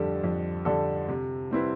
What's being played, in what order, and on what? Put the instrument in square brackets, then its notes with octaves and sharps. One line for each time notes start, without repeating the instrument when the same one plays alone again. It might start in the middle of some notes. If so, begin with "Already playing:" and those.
Already playing: [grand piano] F2 D3 G3 D4 A4
F2
D3 G3 D4 A4
C3
G3 C4 E4 B4